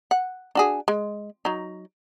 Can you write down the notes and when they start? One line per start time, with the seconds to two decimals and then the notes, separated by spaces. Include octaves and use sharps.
0.11 F#5
0.55 D4 F#4 G#4
0.88 G#3
1.45 F#3 D#4